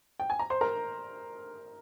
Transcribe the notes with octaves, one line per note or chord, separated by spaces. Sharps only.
G5
G#5
A#5
C5 C6
A#4 A#5